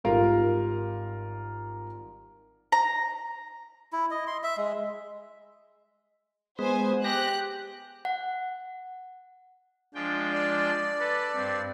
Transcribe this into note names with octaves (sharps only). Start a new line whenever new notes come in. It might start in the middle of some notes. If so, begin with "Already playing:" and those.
G#1 G3 F4 A#4 F5
A#5
E4
D#5
C6
E5
G#3
G#3 B3 C5 G#5
G4 F#6 A#6
F#5
F3 G#3 D4 G5
D5
A4 B4
G2 C4